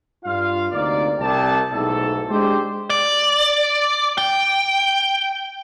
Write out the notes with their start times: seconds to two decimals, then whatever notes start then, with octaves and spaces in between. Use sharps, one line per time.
0.25 G2 F4 F5
0.72 D2 C3 A#3 D#4 D5
1.19 C2 G4 A5
1.72 B1 G#2 A3 E4 A4
2.30 G#3 D4 G4 C5
2.90 D5
4.18 G5